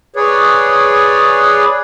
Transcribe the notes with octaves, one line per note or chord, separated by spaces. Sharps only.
G#4 B4 C#5 D5